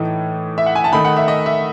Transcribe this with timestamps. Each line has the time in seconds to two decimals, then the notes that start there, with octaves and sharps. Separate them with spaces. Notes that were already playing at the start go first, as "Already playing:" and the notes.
Already playing: A2 E3 A3 D#4
0.58 E5
0.66 F#5
0.75 G#5
0.84 A5
0.92 D#3 A3 D#4 B5
1.05 F#5
1.17 E5
1.28 D#5
1.46 E5